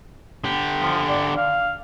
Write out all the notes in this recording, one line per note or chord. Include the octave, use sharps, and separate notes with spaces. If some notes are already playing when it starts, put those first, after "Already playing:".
D3 G4
F3
D5
F5